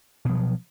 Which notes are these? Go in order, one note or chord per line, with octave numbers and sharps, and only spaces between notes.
B2 F3 F#3